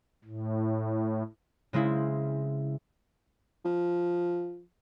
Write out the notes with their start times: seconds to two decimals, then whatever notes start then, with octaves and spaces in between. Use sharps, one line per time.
0.24 A2
1.73 C#3 G#3 C4 E4
3.65 F3